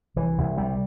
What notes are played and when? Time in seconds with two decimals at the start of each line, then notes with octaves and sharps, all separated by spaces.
0.16 C2 E3
0.38 C2
0.57 C3 G3